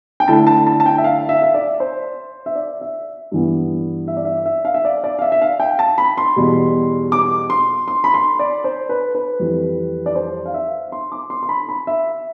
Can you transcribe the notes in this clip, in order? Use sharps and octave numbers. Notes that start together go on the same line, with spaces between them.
G5
D3 A3 E4 A5
A5
A5
A5
G5
E5
F5
E5
E5
D5
C5
E5
D5
E5
G2 E3 B3
E5
D5
E5
E5
F5
E5
D5
D5
F5
E5
E5
F5
G5
A5
B5
C6
E2 B2 G3
D6
C6
C6
B5
C6
D5
C5
B4
B4
F2 E3 G3
D5
C5
F5
E5
C6
D6
C6
C6
B5
B5
E5